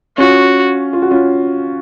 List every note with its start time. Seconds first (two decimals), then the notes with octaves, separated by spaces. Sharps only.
0.18 C#4 F4 F#4
0.93 F4
1.02 F#4
1.11 C#4 F4